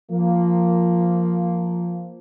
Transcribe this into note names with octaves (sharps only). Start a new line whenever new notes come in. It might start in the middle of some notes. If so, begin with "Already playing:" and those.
F3 A#3